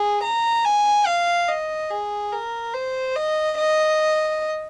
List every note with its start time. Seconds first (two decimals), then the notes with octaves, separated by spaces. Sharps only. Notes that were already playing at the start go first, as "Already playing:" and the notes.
Already playing: G#4
0.23 A#5
0.65 G#5
1.07 F5
1.49 D#5
1.91 G#4
2.33 A#4
2.74 C5
3.16 D#5
3.58 D#5